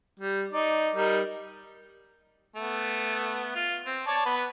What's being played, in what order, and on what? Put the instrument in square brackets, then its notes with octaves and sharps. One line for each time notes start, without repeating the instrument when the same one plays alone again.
[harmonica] G3
D#4 D5
G3 D#4 A#4
A3 B3
F4
C4
C#5 D5 A5
B3 B4